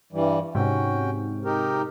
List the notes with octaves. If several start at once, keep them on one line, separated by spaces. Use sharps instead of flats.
G2 E3 G3
G#2 C3 C#4 F#4 G5
D#4 G4 A#4